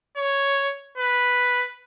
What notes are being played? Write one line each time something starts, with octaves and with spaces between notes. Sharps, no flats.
C#5
B4